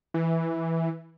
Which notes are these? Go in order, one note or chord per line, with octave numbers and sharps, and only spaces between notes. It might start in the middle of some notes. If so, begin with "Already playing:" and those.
E3